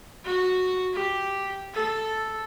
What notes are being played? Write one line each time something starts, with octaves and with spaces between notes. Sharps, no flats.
F#4
G4
A4